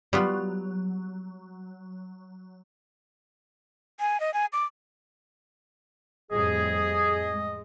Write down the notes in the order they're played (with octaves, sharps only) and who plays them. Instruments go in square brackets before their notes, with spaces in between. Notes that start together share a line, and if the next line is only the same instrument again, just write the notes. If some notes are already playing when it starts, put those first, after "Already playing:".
[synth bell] F#3 [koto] G3 B3 F4
[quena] G#5
D#5
G#5
D6
[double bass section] F2 A2 G3 [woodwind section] G#4 [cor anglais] D#5
[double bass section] G#3